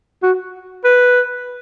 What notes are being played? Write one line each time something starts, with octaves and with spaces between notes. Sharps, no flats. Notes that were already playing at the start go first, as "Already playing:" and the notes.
F#4
B4